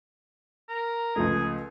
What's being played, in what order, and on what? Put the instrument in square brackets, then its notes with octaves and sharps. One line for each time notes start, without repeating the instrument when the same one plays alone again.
[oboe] A#4
[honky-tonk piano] C#2 F3 A3 [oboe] G#4